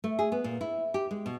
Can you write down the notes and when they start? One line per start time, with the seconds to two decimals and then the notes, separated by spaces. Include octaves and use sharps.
0.04 A3
0.19 G#4
0.32 B3
0.44 A#2
0.61 E4
0.94 G4
1.11 G#3
1.26 B2